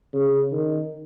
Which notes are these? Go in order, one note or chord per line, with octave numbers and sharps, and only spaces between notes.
C#3
D#3